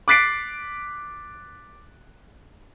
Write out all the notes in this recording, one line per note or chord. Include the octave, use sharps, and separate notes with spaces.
D6 F#6 A6 B6 C7 D7